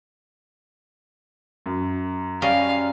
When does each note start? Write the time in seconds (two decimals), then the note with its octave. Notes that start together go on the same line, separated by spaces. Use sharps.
1.66 F#2
2.42 G3 C#4 D#5 F5